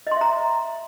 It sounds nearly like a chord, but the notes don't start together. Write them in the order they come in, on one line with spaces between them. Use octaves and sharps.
D#5 C6 E5 A#5